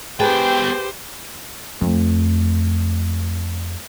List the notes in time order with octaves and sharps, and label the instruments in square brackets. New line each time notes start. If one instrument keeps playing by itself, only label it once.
[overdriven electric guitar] B3 G5 [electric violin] G4 C5 [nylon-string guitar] G#4 B4 A5
[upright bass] F2 A3